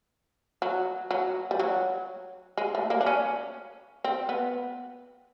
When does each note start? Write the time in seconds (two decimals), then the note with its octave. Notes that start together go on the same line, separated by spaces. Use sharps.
0.62 F#3
1.11 F#3
1.51 G3
1.59 F#3
2.58 G#3
2.75 A3
2.90 A#3
3.01 D4
3.06 C#4
4.05 C4
4.29 B3